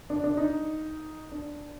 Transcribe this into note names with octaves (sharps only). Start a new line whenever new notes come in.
D4
D4
D#4
D4